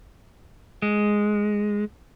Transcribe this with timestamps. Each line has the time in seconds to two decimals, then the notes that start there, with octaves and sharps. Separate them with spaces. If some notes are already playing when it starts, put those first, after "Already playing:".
0.82 G#3